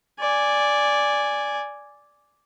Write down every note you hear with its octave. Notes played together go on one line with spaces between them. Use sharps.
D5 G#5